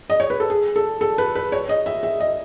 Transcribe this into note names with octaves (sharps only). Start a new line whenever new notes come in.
D#5
C#5
B4
A4
G#4
A4
A4
B4
B4
C#5
D#5
E5
E5
D#5